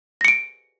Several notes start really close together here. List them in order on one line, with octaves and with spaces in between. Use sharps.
A#6 C#7 D7